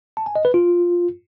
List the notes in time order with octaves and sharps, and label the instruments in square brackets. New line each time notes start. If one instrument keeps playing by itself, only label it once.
[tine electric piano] A5
G#5
D#5
B4
F4